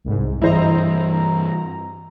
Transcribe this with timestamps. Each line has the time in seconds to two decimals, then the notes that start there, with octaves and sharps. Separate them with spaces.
0.04 C2 G#2
0.42 G2 E3 E4 C5 D#5 A#5